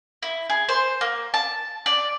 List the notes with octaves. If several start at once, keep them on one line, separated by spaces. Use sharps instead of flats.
E4
G#4
C5
A#3
A5
D5